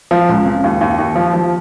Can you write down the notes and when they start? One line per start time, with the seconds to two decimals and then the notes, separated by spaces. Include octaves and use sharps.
0.11 F3
0.29 C#2
0.46 C#3
0.64 D#2
0.81 D#2
0.99 D#2
1.15 F3
1.33 F3